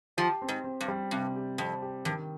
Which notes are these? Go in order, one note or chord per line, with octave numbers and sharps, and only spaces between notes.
F3 G4
C4
G#2
C4
G2
G3
G2 C3
G4
F2 C4
G4
G2 D#3